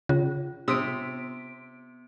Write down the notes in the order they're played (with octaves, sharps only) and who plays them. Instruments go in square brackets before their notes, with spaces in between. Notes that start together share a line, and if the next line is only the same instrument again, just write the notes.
[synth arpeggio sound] C#3 [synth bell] F4
[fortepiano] C3 D#6 E6 [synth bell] B3 B6 D7